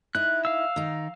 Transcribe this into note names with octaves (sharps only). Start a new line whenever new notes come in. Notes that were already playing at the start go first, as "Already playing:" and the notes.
D#4 E4 F#6
F5 E6
D#3 D#4